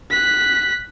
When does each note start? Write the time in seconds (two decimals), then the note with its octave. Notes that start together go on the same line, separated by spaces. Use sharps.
0.11 F#6 B6